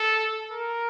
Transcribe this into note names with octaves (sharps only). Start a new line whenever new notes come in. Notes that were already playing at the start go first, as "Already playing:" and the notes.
Already playing: A4
A#4